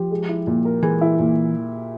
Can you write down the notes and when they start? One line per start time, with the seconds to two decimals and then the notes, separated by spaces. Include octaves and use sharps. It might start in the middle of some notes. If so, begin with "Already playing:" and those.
Already playing: F3 G4
0.11 G#3
0.29 E4
0.47 A#2
0.65 A#4
0.83 E3 G#3
1.01 E4
1.19 A#2